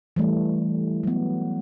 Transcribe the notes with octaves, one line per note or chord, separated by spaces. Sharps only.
E3 G3 A3
F#3 B3